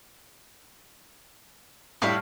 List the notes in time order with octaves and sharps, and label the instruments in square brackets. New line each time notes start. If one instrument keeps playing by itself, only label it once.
[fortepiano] A2 G3 [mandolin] E4 F5